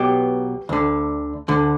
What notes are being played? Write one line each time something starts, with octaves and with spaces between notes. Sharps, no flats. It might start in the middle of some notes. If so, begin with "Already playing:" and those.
Already playing: B1 B2 G4
D2 D3
D2 D3